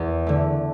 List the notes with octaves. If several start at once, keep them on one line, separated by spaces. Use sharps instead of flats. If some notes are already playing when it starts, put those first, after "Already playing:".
Already playing: E2
D3 A3